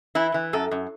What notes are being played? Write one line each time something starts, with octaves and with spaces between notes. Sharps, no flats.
E3 E4
E3
F#2 A4
F#2